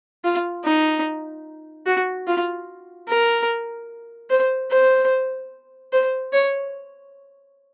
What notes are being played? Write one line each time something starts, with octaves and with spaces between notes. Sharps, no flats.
F4
D#4
F#4
F4
A#4
C5
C5
C5
C#5